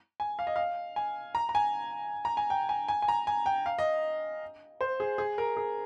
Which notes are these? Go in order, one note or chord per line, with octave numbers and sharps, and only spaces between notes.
G#5
F5
D#5
F5
G#5
A#5
A#5
G#5
A#5
G#5
G5
G#5
G#5
G#5
A#5
G#5
G5
F5
D#5
C5
G#4
G#4
A#4
G#4